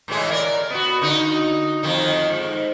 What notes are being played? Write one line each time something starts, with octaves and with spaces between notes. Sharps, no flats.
A2 E3 G#3
A#4 D5
B3 F#4
D3 D#4 F#4
F2 D#3 D#4
G#2